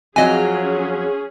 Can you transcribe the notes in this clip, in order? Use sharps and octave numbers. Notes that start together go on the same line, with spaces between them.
F2 F#3 C#4 F4 G#4 D#5 G#5